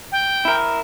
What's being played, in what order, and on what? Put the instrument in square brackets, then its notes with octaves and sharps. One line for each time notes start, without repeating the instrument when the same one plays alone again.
[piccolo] G5
[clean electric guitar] E4 A#4